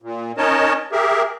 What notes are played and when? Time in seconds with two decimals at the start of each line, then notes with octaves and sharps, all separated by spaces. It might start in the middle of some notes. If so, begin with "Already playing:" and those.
0.02 A#2
0.38 C#4 D#4 A#4 C#5 D#5 A5
0.92 G4 G#4 A#4 E5